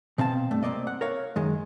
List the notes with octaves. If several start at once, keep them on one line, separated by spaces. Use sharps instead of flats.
B2 C4 F5 A5
G2 A3
C2 A#3 C4 D5 D#5
F#5
A#4 C#5 F5
F#2 D#3 G#3